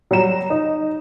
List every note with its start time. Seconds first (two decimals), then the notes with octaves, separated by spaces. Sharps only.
0.11 F#3 G3 A#5 E7
0.50 D#4